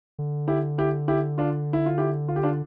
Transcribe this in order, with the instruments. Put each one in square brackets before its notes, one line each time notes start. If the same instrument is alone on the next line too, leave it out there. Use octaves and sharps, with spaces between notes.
[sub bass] D3
[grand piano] E4 G4
E4 G4
E4 G4
D4 F4
E4
F4
E4 G4
F4
G4
D4 F4